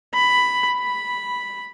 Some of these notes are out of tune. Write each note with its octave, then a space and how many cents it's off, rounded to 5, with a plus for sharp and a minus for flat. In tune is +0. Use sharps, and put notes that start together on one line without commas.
B5 +5
B5 -5